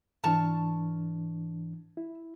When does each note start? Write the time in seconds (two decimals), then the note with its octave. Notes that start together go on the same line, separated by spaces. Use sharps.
0.24 G#2 E3 D4 A5 C#6 F6
1.97 E4